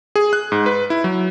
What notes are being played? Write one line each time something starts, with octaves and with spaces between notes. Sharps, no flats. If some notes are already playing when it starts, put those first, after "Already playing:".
G#4
F#6
G#2
B4
E4
F#3